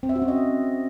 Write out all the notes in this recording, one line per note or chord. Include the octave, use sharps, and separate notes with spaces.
C4
E5
F#4
C#4
D#5